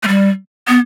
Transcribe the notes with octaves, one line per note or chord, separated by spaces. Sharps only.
A3
G3
B3